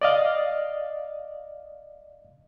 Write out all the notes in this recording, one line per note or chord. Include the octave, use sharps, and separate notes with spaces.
D5 D#5 F5